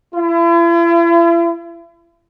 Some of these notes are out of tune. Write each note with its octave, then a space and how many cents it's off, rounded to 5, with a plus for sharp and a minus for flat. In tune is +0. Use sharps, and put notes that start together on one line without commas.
E4 +45